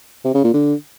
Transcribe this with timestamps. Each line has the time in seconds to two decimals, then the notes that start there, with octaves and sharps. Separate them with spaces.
0.25 C3
0.34 C#3
0.44 A#2
0.54 D3